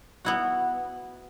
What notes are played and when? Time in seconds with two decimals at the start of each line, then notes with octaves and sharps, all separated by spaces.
0.25 B3 E4 F#4